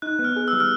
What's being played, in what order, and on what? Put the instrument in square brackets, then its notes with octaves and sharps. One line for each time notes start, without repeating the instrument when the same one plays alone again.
[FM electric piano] D#4 [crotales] F#6
[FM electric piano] B3
[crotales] F6
[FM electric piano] G#4
[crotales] E6
[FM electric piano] G3
[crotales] F6